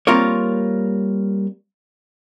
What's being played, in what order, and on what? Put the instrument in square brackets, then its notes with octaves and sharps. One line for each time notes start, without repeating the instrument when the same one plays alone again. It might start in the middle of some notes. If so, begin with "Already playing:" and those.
[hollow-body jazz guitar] G3 A#3 C4 F4 A#4 C#5